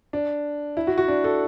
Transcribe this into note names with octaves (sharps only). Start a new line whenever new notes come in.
D4
E4
F#4
F#4
D4
A4